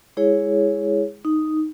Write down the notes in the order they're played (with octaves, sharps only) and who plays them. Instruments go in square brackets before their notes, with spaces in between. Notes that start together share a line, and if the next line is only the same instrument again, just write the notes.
[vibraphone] G#3 E4 G#4 C#5
D#4